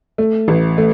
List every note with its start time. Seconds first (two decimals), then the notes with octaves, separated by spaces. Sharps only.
0.18 A3
0.48 A1
0.78 A3